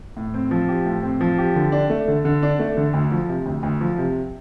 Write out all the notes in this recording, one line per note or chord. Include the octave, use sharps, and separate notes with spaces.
A2
C4
F3
G4
A2
C4
F3
G4
D3
D4
A3
D3
D3
D4
A3
D3
D2
F3
C3
D2
D2
F3
C3